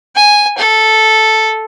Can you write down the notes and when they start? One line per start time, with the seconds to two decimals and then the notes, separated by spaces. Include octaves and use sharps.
0.16 G#5
0.58 A4